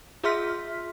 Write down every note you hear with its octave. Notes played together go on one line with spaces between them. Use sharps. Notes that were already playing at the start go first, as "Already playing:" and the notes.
F4 G#4 E5 C6 F6 B6